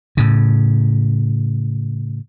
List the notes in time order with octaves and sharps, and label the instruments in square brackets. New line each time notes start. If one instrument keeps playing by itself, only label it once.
[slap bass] A2 C#3